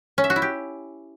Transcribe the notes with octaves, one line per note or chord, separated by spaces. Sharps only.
C#4
E5
F#4
E4
G4